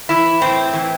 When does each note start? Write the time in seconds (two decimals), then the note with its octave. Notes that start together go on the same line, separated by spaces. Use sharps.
0.09 E3 E4
0.41 A2 C4
0.73 E3